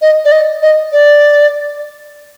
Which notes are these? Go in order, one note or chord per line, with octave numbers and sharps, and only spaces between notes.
D#5
D5
D#5
D#5
D5